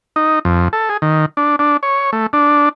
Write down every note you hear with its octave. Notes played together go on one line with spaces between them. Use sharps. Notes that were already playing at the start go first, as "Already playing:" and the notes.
D#4
F2
A4
G#4
D#3
D4
D4
C#5
A3
D4